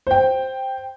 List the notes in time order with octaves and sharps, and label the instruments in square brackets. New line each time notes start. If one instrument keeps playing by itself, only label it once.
[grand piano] C5 G5